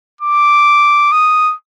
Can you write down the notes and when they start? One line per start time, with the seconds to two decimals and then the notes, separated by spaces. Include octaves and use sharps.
0.21 D6
1.12 D#6